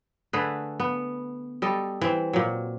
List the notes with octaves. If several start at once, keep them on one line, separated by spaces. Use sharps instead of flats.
D3 A3 G#4 B4
B3
G3 A4 D#5
E3 C4
A#2 F#3